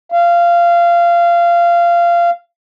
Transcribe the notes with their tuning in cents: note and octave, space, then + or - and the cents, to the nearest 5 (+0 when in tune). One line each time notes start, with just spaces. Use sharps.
F5 -20